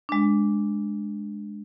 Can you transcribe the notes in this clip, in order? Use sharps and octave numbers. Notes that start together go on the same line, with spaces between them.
G#3 D4